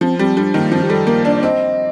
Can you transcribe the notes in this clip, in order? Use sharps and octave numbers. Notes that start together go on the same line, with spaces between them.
F3 C4
G3 C4
G3 D4
D#3 A#3
F3 C4
G4
G3 A4
A#3 A#4
D4 D5
D5
C4 D#5